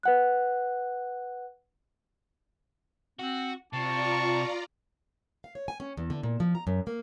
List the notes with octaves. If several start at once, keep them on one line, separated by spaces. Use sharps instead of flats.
B4 F#5 F#6
C4 F#4
C3 F4 D5 A5 A#5 C#6
F5
C#5
G#5
C#4
E2
D3
A#2
F3
A#5
F#2
A#3